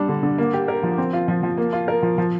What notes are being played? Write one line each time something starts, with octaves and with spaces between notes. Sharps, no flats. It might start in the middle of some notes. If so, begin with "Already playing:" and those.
Already playing: G3 D4
D3
D3
A#3
G4
A#4
F3
C4
F4
F3
F3
A#3
F4
A#4
F3
F3